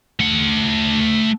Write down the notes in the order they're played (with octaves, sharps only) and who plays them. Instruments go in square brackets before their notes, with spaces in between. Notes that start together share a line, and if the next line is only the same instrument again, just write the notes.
[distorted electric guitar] A3 F#5